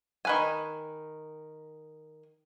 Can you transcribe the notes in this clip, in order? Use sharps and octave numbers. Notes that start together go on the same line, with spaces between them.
D#3 B4 G#5